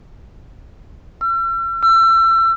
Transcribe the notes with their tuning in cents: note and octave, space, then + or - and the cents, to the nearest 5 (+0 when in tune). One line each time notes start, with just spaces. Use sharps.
E6 +45
E6 +30